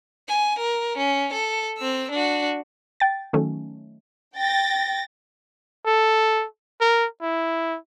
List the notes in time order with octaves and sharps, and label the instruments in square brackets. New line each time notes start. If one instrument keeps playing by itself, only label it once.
[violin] G#5
A#4
C#4
A4
C4 E6
D4 F#4
[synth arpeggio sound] G5 A6
D#3 F#3 A3 C#4
[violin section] G5 A6 A#6
[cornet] A4
A#4
E4